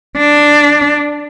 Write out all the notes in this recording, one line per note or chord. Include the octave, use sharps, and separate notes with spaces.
D4